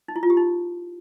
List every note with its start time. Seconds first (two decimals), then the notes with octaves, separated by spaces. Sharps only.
0.08 D#4
0.16 E4
0.23 F4
0.30 G4
0.37 D#4